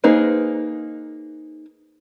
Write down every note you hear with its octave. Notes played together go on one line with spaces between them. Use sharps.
A#3 D#4 G#4 B4 C5